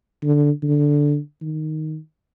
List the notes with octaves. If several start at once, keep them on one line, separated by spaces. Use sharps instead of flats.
D3
D3
D#3